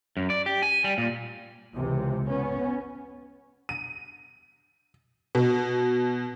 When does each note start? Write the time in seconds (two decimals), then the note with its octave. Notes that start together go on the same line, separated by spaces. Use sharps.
0.17 F#2
0.30 D5
0.46 G4
0.63 G#5
0.84 G3
0.98 A#2
1.75 C#2 C3 E3
2.28 B3 C#4
3.69 D#7
5.35 B2